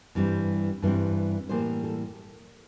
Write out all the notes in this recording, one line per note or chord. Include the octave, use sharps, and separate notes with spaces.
G2 E3 G3 C4
G2 E3 G3 C4
A2 E3 G3 A#3 C5
A4